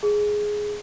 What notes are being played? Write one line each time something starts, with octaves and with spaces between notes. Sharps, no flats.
G#4